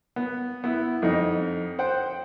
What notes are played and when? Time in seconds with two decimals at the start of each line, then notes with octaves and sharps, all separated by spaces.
0.16 B3
0.64 B3 E4
1.02 F2 D#4
1.79 C5 F#5 G5